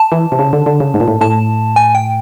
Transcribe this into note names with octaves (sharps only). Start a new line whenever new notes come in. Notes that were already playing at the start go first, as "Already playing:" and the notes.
Already playing: A5
E3
C3
C#3
D3
D3
C#3
G#2
A#2
A2
A2 A5
G#5
G5